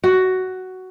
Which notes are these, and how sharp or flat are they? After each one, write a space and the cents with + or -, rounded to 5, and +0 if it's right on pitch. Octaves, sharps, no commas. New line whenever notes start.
F#4 +10